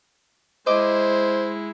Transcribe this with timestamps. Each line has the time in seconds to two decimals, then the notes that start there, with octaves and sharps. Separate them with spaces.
0.67 G#3 E4 C5 D#5 D6